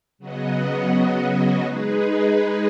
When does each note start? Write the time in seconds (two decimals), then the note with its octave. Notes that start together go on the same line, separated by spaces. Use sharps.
0.19 C#3 F#3 B3 F#4 D#5
1.62 G#3 D#4 G#4 B4